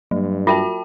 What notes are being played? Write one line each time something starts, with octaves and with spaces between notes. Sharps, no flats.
G2 F#3
F4 F#4 E5 G5 A5